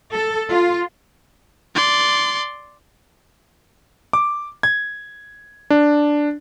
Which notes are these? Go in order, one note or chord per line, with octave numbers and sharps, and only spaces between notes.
A4
F4
D5 C6
D6
G#6
D4